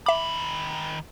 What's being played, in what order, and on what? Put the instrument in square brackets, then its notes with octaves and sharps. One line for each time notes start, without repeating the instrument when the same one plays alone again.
[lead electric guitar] D#3 B5 [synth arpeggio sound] E5 D6